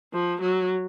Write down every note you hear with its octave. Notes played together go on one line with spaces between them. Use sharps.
F3
F#3